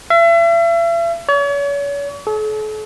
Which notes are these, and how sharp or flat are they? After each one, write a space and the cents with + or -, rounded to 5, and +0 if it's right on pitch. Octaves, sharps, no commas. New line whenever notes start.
E5 +40
C#5 +40
A4 -45